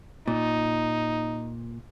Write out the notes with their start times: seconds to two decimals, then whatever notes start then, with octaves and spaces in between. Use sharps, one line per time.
0.28 A#2 D#4